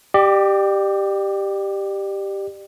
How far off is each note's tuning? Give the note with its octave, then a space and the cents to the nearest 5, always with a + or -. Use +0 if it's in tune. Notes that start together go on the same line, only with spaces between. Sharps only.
G4 +0 D5 +35